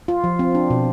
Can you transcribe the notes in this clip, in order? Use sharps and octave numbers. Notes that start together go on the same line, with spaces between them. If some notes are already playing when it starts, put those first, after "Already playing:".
F4
F3
C4
D4
B2